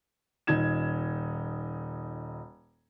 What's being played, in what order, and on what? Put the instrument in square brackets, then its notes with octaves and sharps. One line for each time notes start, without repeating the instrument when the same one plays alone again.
[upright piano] D#1 D#4 G#6 E7